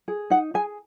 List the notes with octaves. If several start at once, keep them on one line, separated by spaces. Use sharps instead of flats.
G#4
D#4 F#5
G#4 G#5